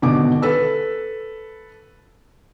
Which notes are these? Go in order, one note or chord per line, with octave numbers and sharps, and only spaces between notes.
G#1 B2 D3 D6
A4 B4 E6